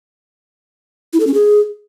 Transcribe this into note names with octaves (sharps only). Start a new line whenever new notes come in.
E4
A4
C#4
G#4